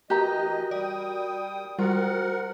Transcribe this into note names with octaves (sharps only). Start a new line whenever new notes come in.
E3 F#4 G4 A#4 D#5 A#5
G3 D5 G5 D#6
G3 F4 F#4 A#4 C5 F#5